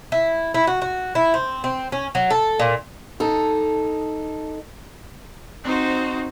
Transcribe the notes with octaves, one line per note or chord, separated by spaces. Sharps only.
E4
E4
F#4
F#4
E4
C4
C4
C#4
F#3
A4
A#2
D#4 A4
C4 D#4 F#4 C5